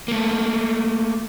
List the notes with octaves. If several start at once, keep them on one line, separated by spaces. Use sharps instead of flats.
A3 A#3